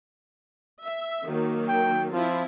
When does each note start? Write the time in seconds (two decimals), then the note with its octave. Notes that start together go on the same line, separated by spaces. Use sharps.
0.79 E5
1.24 D#3 F#3 A#3
1.69 G5
2.13 F3 C4 E4 F4